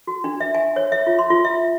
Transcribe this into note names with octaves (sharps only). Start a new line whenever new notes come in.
F#4
D4
E5
G#5
C#5
E5
F4
C6
F4
E5